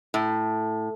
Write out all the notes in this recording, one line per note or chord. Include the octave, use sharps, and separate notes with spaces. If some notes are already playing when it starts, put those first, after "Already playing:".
A2